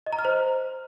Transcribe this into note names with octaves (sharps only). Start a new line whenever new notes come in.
D#5
A#5
F6
C5